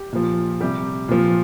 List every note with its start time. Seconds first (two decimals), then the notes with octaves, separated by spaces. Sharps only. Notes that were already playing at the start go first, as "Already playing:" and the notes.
Already playing: G4
0.13 A#2 F3
0.61 C3 G3 G4
1.09 A#2 F3